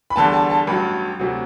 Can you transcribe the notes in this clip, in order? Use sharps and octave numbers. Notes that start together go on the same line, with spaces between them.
B5
E2 D3 G3 A5
A5
A5
A1 G2 F#3 B5
D2 C3 F#3